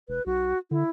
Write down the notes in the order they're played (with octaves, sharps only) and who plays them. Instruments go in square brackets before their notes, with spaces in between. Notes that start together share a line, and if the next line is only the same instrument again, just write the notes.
[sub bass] E1 [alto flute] B4
[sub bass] B1 [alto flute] F#4
[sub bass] D3 [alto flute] E4